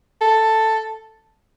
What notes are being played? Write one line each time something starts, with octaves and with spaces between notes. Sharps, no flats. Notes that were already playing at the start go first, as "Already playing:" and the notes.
A4